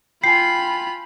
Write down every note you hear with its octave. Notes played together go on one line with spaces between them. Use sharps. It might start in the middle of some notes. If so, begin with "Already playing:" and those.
F4 G5 G#5 B5 C7